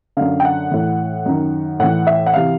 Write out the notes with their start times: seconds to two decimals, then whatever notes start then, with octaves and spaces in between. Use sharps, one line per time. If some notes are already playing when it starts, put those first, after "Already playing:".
0.17 F#2 D3 F5
0.40 G5
0.45 F#5
0.71 A2 E3
1.26 F#2 D#3
1.79 A2 E3 F#5
2.07 E5
2.26 F#5
2.34 C3 E3 F5